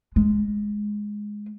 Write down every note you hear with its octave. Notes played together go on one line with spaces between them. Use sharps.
G#3